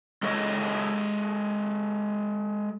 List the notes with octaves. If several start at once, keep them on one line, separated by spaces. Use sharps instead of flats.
G#3 A4 C#5 D#5